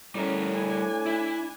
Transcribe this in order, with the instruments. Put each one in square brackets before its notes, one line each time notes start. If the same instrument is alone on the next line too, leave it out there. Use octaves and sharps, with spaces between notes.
[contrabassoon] A2 [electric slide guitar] G3 A#4 [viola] C#4
[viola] D4 G#5
[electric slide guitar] E4